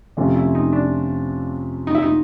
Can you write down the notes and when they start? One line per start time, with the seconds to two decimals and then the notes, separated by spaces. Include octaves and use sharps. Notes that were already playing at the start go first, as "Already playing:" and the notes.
0.17 F2 C3 F3 A3 C#4
0.35 E4
0.55 D#4
0.73 D4
1.87 D#4
1.95 E4
2.02 D#4